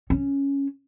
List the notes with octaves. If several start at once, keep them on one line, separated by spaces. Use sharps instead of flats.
C#4